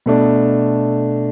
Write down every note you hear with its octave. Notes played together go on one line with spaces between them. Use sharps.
B2 A3 D4